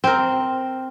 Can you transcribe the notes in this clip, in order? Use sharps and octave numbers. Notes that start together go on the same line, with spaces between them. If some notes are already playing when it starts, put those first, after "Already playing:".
C4 A#4